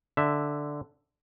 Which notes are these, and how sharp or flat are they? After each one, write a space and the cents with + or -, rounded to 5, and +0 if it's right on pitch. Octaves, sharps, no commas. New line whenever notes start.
D3 +0 E5 +0